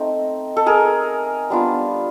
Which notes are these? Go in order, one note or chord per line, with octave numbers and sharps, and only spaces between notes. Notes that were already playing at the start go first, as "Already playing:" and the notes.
Already playing: A3 C4 D#4
A4
G#4 A#4
G3 B3 D4 F4